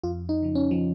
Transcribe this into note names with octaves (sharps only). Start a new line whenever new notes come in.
F2 F4
D#4
C#3 F3
C#4
F3